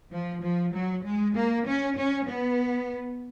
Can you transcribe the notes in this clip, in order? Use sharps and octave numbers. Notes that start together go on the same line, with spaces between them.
F3
F3
F#3
G#3
A#3
C#4
C#4
B3